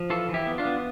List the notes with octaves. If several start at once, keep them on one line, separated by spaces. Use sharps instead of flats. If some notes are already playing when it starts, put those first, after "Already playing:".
Already playing: F3
E3 F4 A4
E3
E4 G4
B3
D4 F4
B3